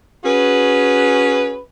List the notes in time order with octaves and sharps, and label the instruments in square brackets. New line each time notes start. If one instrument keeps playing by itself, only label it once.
[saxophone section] C#4 F#4 G#4 B4